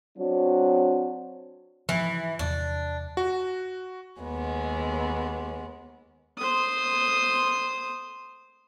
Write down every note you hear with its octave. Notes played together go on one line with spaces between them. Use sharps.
F#3 C4 D4 F#4
G#2 E3 F3
E2 C3 D4
F#4
D#2 G#3 B3
C5 D#6